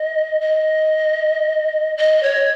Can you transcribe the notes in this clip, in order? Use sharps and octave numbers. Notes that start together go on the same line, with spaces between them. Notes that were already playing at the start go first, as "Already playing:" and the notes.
Already playing: D#5
D#5
D#5
C#5